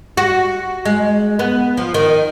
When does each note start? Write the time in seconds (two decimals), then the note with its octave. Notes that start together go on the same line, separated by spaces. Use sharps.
0.17 F#4
0.85 G#3
1.39 B3
1.77 F3
1.94 D#3